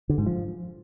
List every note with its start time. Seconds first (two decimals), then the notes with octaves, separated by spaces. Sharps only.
0.09 D3
0.18 G#2
0.26 F3